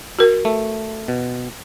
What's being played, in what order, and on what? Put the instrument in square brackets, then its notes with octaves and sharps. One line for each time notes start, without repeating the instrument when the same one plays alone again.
[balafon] F#4 A#4
[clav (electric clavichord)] A3
B2